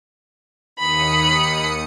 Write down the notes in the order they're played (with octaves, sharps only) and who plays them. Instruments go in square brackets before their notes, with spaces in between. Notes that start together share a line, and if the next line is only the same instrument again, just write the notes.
[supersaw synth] D#2 D#6 C#7 [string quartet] B5